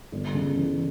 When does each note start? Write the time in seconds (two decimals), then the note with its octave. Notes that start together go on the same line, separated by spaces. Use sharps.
0.12 G1
0.34 C#3
0.56 E3